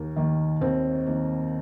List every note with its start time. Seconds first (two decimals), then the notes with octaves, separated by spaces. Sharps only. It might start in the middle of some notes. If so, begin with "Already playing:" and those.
Already playing: D#2 A#3
0.16 D#3 A#3
0.61 D#2 C4
1.07 D#3 A#3